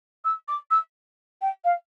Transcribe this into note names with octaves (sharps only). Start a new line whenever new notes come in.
E6
D6
E6
G5
F5